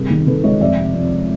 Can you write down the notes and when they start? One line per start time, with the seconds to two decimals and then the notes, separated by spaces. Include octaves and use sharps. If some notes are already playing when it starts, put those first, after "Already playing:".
Already playing: G2 C3 G#4 A#4
0.10 D#3
0.27 D#3 A4 B4
0.44 C#2 C#5 D#5
0.61 F2 D5 E5
0.78 C3
0.95 F2